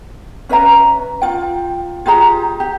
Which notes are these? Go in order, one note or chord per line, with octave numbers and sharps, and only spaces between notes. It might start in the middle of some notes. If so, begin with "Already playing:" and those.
C#4 B4 E5 A#5
F4 G5
F4 G4 G#4 A#5
G4